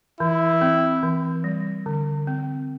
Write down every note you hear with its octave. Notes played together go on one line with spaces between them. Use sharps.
E3 E4
C4
E3
G3
D3
C4